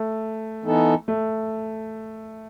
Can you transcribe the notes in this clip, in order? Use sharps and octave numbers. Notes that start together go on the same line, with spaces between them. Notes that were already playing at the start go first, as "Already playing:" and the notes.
Already playing: A3
E3 B3 D#4 A4
A3